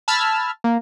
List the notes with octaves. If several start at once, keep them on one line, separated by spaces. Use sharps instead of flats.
A5 B5 E6 F6 G#6
A#3